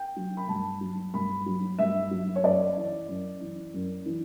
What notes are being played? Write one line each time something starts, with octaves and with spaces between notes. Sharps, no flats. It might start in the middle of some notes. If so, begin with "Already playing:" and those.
Already playing: G5
F#3
B5
G2 A5
F#3
G2 B5
F#3
G2 E5
F#3
C#5
F#2 D5
E3
F#2
E3
F#2
E3